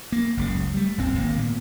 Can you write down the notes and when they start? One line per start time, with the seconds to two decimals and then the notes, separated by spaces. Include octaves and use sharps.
0.12 A#3
0.37 F#1 C#2 C#3
0.74 G3 A3
0.98 D#1 G#1 C4
1.19 G#1 D#3 A#3
1.37 A#2 A#3 B3